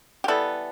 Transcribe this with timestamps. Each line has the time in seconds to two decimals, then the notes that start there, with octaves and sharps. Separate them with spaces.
0.24 G4
0.28 E3 G3 B3 E4 A4